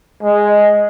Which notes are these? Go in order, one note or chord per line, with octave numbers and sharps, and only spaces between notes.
G#3